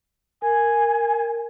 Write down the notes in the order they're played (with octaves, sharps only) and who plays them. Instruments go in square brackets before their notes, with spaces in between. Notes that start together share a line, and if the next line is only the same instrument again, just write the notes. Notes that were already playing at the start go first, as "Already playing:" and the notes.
[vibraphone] A#4 [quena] G#5